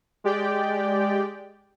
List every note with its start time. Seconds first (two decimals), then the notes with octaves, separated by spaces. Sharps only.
0.24 G#3 G4 D5 G5